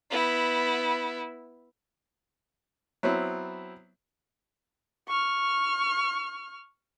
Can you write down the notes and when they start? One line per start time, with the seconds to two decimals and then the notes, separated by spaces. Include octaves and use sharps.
0.11 B3 E4
3.03 F#3 B3 C4 E4
5.08 C#6 F6